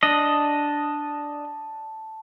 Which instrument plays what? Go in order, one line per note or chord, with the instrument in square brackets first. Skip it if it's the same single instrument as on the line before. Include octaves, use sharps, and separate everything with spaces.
[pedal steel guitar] D4 D#5 [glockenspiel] A5